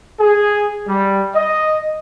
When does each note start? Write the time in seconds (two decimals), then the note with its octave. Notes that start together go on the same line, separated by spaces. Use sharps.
0.19 G#4
0.87 G3
1.35 D#5